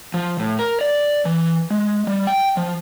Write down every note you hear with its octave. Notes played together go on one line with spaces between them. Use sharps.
F3
A2
A#4
D5
E3
G#3
G3
G5
F3